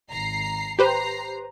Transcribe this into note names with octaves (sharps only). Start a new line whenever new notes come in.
G#1 A#5 C7
G4 B4 C5 A#5 C7